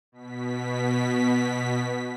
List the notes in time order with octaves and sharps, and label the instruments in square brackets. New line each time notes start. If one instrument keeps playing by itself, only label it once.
[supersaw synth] B2 B6